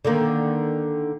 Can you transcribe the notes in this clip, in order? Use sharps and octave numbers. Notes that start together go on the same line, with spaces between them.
D3 D#3 A#3